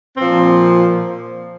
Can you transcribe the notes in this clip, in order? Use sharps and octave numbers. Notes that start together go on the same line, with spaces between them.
A#2 F3 C4